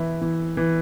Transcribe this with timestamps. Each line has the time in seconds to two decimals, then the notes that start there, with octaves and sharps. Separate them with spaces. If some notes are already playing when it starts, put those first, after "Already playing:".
Already playing: E3 E4 E5
0.22 E3
0.57 E3